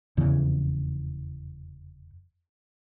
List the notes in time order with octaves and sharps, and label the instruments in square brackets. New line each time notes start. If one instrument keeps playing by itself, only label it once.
[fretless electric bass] F1 E2 C#3 E3